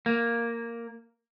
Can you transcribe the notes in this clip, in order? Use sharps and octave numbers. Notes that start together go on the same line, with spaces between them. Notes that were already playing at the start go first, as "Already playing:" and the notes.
A#3